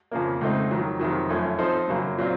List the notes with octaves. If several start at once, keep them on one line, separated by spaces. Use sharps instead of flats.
F2 C#3 F3 A#3
C#2 C#3 A3 C4 D#4
F2 D#3 F#3
F2 C3 D#3 F#3
F#2 F3 A3 C#4
F3 C4 D#4 A4 C5
F#2 C#3 F#3 A#3
A#2 F#3 C4 F4